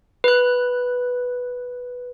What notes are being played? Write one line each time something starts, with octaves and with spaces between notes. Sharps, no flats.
B4 F#6